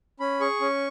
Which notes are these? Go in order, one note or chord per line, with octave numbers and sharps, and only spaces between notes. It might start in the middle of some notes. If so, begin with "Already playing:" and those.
C#4 B5
G#4 C#6
C#4